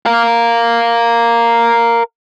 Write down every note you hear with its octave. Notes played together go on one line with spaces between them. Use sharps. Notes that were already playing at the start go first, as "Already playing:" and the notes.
A#4 F5